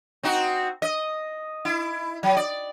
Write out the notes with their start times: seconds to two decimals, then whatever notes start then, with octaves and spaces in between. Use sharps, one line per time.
0.23 C4 D#4 F#4
0.82 D#5
1.65 E4
2.23 F#3
2.37 D5